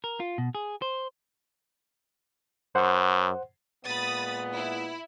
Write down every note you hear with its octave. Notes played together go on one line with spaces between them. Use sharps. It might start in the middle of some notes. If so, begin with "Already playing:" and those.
A#4
F4
B2
G#4
C5
F#2 C5 F#5
A#2 G#3 B3 B5 D#6 A6
E4